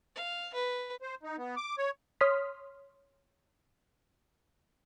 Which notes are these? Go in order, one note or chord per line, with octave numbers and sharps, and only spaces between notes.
F5
B4
C5
D#4
B3
D6
C#5
C#5 C6 D#6 F6 B6